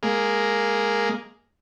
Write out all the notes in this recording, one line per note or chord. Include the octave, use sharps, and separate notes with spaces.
G#3 A#3